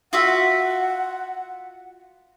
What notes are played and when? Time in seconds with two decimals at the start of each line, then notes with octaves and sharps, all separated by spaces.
0.13 F4 F#4 E5 F#5